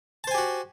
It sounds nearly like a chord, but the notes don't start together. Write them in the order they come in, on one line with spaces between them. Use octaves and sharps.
A5 C5 G#5 G4 F#4